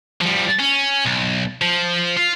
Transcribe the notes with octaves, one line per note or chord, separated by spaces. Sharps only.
F3 G3
C#4
B1
F3
F4